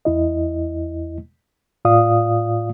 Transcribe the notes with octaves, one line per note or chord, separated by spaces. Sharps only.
E2 E4 D#5
A2 F4 D5 F5 D#6